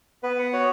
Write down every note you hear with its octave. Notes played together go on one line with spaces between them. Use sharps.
B3 B4
F#5
F#4 C#5